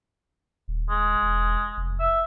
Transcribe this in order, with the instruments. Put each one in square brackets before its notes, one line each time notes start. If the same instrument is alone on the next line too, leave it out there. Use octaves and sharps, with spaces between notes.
[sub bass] D#1
[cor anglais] G#3
[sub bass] E1
F1
[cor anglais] E5